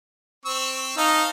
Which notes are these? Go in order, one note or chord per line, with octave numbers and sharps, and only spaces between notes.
C4 C#6 E6
D#4 D#5 F5 A5